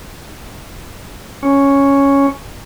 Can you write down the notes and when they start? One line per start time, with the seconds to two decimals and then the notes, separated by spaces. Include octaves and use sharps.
1.43 C#4